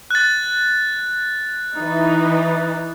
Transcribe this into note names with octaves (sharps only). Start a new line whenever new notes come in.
F#6 A6
E3 D#4